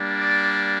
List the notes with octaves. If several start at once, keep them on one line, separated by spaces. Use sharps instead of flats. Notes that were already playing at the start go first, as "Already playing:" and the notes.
Already playing: G3 A#3 D4
D5